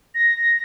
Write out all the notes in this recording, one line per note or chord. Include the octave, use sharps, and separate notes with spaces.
A#6